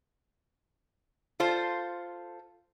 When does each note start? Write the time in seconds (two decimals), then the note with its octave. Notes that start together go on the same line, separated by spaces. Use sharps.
1.40 F4 A4 C5